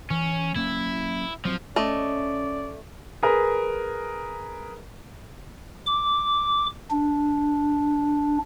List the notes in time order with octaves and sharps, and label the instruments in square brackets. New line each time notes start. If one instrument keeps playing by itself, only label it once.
[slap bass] E3 [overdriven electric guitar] C#4
[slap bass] F#3 A#3 C#4 [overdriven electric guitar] E4
[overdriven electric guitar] F3 [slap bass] F#3 C4
[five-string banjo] A3 D#5 [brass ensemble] C#4 [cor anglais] D5
[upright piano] G#4 A#4 B4
[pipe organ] D6
D4